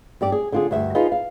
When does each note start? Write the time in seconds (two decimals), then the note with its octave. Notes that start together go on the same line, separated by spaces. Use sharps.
0.21 G2 G4 D5
0.32 G#4
0.52 D3 F4 G#4
0.71 D2 G2 E5
0.95 D#4 F4 G#4 B4
1.12 F5